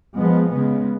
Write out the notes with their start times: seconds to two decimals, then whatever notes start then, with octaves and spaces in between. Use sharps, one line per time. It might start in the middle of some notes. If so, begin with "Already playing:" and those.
0.18 F3 G#3 B3
0.51 C#3 G#3 B3